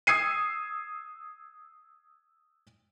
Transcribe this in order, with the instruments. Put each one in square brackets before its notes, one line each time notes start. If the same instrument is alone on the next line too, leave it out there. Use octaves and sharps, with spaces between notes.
[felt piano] D#6 E6 G#6 C7 D#7